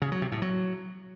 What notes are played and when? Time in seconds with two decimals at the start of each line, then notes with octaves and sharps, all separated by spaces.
0.02 C#3
0.12 F#3
0.22 C3
0.32 A2
0.42 F#3